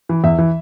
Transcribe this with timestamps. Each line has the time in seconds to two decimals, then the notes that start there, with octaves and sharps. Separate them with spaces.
0.09 E3
0.24 E2 E5
0.38 E3